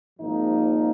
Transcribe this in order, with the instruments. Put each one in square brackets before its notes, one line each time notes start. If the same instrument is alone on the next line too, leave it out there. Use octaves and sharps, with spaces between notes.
[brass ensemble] G#1 G#2 F3 A#3 D#4